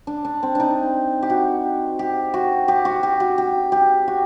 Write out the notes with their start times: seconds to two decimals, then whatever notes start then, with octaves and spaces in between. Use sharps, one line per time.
0.07 D4
0.25 D4
0.43 C4
0.55 D4 D#4
1.23 G4
1.30 F#4
1.99 G4
2.34 F#4
2.68 G4
2.85 F#4
3.03 G4
3.20 F#4
3.38 G4
3.72 G4
4.08 F#4